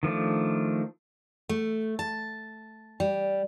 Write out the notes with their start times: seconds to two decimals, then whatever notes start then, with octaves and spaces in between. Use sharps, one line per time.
0.03 D#3 F3 A3 D4
1.49 A3
1.99 A5
3.00 G3